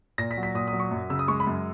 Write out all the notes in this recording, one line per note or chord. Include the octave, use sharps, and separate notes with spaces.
A#2 A#6
B6
F#3
B6
A#2 D#6
D#6
F#3
C#6
F#2
C#3 E6
D#6
G#3 C#6
B5
F#2